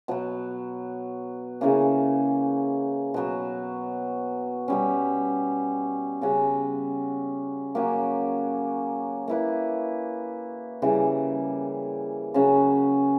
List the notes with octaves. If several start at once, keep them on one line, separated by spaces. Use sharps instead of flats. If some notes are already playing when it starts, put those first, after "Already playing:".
B2 F#3 B3
C#3 E3 A#3 C#4
B2 F#3 B3
B2 G3 C#4
C#3 G3 C#4 F#4
F#3 A#3 C#4 G4
A#3 E4 B4
C#3 E3 G3
C#3 F#3 C#4